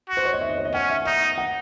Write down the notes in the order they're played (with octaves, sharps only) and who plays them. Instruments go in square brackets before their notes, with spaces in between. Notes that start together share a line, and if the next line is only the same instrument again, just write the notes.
[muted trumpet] F#4
[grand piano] C5
C#5
D#5
E5
D#5
C#5
D#5
[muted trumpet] C#4 [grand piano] F#5
[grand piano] E5
[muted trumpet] D#4 [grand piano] E5
[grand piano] F#5